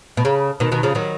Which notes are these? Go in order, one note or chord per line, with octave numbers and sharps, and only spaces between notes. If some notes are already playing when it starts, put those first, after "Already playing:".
B2
C#3
B2 D#3
B2 D#3
C#3 F3
D#3 F#3